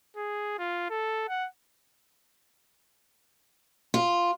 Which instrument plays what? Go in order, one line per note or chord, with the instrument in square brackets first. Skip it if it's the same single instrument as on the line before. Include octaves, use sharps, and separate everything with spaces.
[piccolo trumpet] G#4
F4
A4
F#5
[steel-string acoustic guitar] F4